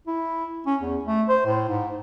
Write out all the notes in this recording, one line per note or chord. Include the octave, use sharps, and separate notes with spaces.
E4
C#4
E2
A3
C5
A2
G#2